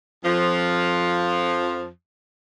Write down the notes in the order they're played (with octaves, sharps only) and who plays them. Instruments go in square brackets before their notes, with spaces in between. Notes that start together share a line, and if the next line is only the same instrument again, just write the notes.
[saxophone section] F2 F3